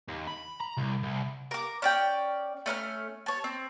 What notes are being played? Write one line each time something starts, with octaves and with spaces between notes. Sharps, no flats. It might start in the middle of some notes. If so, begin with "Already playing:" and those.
D#2
B5
A#5
C2
C2
A#4 D6
C#4 D5 G5
A3 C#4 A#5 F6
C#5 A5
C4